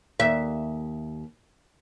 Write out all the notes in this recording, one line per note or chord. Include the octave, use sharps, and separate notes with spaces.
D#2 E5